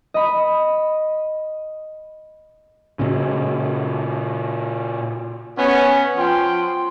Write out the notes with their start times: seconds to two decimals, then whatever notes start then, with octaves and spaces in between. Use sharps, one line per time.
0.14 D#5 B5
2.99 A#2 C#3
5.58 B3 C#4
6.17 F3 G5 C6